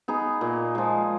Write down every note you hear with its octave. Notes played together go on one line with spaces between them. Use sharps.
B3 D#4 G#4
A#2
F3 G#3